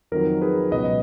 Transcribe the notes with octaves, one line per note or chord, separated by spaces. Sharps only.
F2 D#3 F#3 A#4
G#4 B4
C#2 B2 F#3 B4 D#5